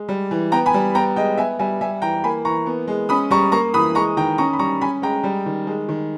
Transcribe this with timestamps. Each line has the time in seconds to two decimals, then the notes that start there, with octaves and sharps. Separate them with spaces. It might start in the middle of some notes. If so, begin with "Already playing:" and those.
Already playing: G#3
0.09 G3
0.31 E3
0.52 B3 G5 A#5
0.66 G#5 B5
0.74 G3
0.95 B3 G5 A#5
1.16 G#3 D#5 G5
1.38 B3 E5 G#5
1.59 G3 E5 G#5
1.81 G3 E5 G#5
2.02 E3 G5 A#5
2.24 A#3 G#5 B5
2.45 E3 A#5 C#6
2.66 B3
2.88 G#3
3.09 C#4 B5 D#6
3.31 G3 A#5 C#6
3.52 A#3 A#5 C#6
3.74 E3 B5 D#6
3.95 G#3 A#5 C#6
4.17 D#3 G5 A#5
4.38 C#4 A#5 C#6
4.53 B5
4.59 G3 A#5 C#6
4.81 C#4 G#5 B5
5.02 G#3 G5 A#5
5.24 G3
5.46 D#3
5.67 G#3
5.89 D#3